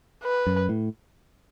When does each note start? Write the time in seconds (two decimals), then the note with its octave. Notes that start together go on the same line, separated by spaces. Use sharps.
0.24 B4
0.47 F#2
0.69 A2